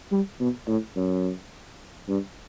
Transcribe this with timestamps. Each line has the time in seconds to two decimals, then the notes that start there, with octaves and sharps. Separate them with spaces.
0.12 G3
0.40 B2
0.68 A2
0.96 F#2
2.09 G2